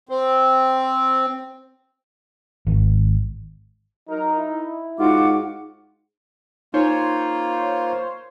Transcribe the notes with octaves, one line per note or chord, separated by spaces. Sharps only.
C4
G#1
F#3 D#4 A#4
E4
G#2 F4 F#4 F#5 D6
A#3 D#4 F4 C5 C#5